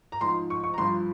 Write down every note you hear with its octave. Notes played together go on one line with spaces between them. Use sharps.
A#5
G#2 F3 C6
C#6
C#6
A#5
G2 F3 C6